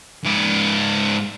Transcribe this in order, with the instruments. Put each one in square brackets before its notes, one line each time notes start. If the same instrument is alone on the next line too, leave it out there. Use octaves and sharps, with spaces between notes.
[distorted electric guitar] G#2 D5